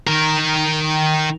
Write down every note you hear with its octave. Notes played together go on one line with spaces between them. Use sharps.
D#3 A#4